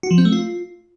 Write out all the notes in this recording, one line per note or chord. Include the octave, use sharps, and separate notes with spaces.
F#4
F3
C4
A3
F4